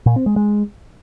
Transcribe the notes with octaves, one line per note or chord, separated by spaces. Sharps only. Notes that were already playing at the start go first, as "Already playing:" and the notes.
A#2
C4
G#3
G#3